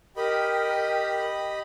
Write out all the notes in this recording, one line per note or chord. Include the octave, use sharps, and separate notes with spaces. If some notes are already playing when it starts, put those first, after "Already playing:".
G4 A#4 D#5 G5 B5